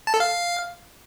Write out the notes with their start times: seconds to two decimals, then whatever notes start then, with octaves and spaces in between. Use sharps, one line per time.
0.07 A5
0.14 A4
0.20 F5